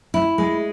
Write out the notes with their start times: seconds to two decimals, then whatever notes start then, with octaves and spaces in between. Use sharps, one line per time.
0.14 E4
0.38 G#3